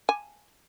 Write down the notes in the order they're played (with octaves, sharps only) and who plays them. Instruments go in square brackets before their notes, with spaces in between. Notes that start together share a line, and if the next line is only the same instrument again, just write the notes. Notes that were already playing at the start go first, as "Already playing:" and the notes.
[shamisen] G#5